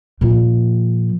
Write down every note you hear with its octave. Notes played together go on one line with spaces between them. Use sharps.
A#2 F3